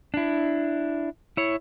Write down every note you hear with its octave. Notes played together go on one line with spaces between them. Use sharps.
D4 E4
E4 C#5